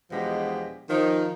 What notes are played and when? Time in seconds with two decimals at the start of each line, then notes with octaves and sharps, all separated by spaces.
0.11 E2 B2 F3 G#3 D4 G4
0.90 D#3 F3 D#4